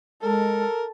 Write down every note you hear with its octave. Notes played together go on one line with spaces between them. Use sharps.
G#3 A4 A#4